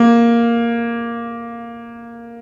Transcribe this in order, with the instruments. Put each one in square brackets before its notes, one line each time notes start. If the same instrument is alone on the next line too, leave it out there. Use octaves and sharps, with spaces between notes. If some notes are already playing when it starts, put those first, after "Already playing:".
Already playing: [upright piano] A#3